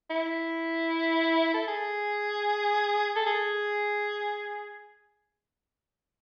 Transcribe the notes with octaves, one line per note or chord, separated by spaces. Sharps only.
E4
A4
G#4
A4
G#4